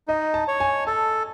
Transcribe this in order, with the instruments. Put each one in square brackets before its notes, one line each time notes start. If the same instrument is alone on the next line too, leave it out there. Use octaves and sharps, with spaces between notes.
[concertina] D#4 [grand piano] D#5
[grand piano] A5
[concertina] C#5
[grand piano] G#5
[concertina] A4 [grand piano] A5